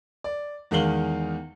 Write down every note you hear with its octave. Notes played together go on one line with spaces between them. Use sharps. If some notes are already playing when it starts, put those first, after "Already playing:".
D5
E2 D#3 G#3 F5 F#7 G7